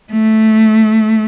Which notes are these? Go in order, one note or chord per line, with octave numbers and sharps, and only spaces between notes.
A3